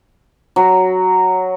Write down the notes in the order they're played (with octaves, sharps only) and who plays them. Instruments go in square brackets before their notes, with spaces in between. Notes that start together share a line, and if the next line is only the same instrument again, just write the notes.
[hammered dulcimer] F#3